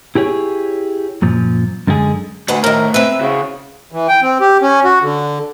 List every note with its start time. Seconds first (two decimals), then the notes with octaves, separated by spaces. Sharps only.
0.15 E4 G4 G#4 C#5
1.22 F#2 A#2 F3
1.87 F#2 D3 G#3 F#4 G#4
2.48 D2 A3 B4 C5 F#5
2.64 A2 D#3 A#4
2.94 C4 B4 E5
3.21 C#3 E4 F#4
3.92 E3
4.08 G5
4.22 C4
4.40 G4
4.62 C#4
4.84 F#4
5.02 D3